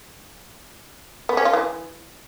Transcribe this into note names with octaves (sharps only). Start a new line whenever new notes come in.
B3
C#4
F4
E3